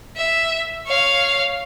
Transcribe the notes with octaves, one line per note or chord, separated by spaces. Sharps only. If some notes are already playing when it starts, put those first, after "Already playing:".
E5
C#5 F5